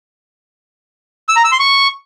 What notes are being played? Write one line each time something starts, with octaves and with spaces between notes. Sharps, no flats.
E6
A#5
E6
C6
C#6